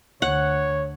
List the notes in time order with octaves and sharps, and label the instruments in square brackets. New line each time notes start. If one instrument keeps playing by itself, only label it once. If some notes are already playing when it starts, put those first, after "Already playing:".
[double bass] D2 [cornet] C#5 [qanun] F#5